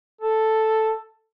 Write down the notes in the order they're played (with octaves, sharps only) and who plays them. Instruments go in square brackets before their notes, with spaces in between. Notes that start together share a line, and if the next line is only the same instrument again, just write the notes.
[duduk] A4